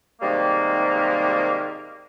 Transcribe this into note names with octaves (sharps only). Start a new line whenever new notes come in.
G#2 C3 D#3 G3 G#3 A#3